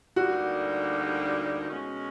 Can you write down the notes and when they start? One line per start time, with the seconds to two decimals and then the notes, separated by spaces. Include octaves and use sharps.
0.16 D2 D3 G3 A#3 D#4 F#4
1.68 B2 G#3 C#4